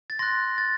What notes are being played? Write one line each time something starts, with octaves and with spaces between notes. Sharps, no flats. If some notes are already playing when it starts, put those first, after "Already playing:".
A6
C6 F#6 A#6
A6